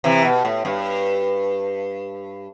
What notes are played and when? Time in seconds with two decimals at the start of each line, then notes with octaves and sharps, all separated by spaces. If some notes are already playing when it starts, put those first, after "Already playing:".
0.04 C3 E3
0.25 B2
0.45 A2
0.65 G2